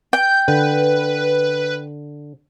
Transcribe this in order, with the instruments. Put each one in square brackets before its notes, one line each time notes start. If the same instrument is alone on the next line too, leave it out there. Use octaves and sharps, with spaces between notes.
[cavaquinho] G5 [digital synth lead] G6
[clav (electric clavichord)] D3 [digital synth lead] B4